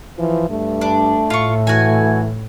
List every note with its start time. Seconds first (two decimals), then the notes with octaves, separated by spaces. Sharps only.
0.18 E3 F3
0.50 G2 A3
0.81 D4
1.30 A2 F4 C#6
1.67 E3 F#4 G#5